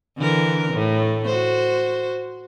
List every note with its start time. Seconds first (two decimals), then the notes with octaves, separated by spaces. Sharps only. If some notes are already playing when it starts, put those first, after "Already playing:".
0.18 D3 E3 A#4
0.74 A2 A3
1.25 F#4 C5